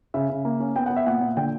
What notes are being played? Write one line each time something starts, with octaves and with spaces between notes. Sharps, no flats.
C#3 E5
C#3
A#3
C#4
B3 G5
B3 F#5
E5
A#2 F#5
A#2
D3 G5